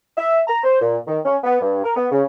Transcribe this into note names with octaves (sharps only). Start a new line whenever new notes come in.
E5
A#5
C5
A#2
D#3
C#4
B3
G2
A#4
B3
C#3